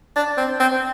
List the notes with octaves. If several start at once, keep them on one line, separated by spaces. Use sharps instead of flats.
D4
C4
C4